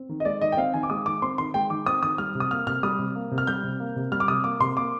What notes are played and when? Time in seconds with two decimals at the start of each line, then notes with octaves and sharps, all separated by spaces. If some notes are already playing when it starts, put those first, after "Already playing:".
Already playing: C4
0.09 D#3
0.20 D#5
0.25 G#3 D5
0.41 D#3 D#5
0.52 G5
0.57 C4 F5
0.74 D#3 G#5
0.83 D6
0.90 G#3 D#6
1.06 D#3 D6
1.22 C4 C6
1.38 D#3 C6
1.54 G#3 G5
1.70 D#3 D6
1.86 C4 D#6
2.02 D#3 D#6
2.18 G3 F6
2.35 C3
2.40 D#6
2.51 A#3 F6
2.67 C3 F6
2.83 G3 D#6
2.99 C3
3.16 A#3
3.31 C3
3.38 F6
3.47 G3 G6
3.64 C3
3.80 A#3
3.96 C3
4.12 G3 F6
4.20 D6
4.28 C3 D#6
4.44 A#3 D6
4.60 C3 C6
4.76 A#3 D6